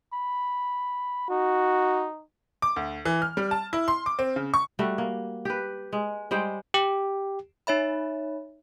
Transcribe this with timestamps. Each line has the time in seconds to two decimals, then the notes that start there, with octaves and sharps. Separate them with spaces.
0.13 B5
1.30 D#4 F#4
2.62 D6
2.76 D2
3.05 E3
3.22 F6
3.37 G3
3.51 A5
3.73 E4
3.88 C6
4.06 D6
4.19 C4
4.36 C#3
4.54 C#6
4.79 G3 A3 F#4
4.98 A#3
5.45 G4 B4
5.92 G#3
6.31 G3 G#3 C5 G5
6.74 G4
7.67 D#4 C#5 E5 B5